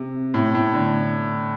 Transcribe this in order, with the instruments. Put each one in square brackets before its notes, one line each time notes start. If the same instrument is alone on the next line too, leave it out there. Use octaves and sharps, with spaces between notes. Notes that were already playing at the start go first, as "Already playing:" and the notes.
Already playing: [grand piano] C3
A2
A2
D3